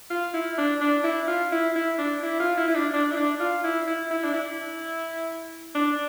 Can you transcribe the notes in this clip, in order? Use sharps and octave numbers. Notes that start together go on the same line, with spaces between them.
F4
E4
D4
D4
E4
F4
E4
E4
D4
E4
F4
E4
E4
D4
D4
E4
D4
F4
E4
E4
E4
D4
E4
D4